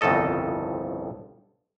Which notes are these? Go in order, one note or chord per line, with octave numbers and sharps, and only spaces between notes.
G1 C2 F2 C#3 A4 D#5